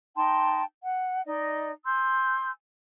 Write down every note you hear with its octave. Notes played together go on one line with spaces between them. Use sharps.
D#4 G5 A5 C6
F#5
D#4 D5 D#5
G#5 C6 E6 G6